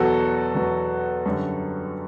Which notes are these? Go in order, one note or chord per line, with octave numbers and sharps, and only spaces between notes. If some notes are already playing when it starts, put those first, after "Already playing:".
Already playing: E2 B2 F#3 F#4 A4
E2 B2 F#3
F#2 D3 G3